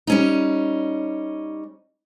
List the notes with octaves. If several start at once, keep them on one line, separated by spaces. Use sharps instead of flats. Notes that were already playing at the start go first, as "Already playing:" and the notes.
G3 C#4 D#4